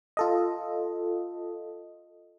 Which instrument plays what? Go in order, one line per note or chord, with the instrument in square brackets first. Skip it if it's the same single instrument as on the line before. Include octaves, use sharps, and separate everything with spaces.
[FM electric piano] F4 A4 D#5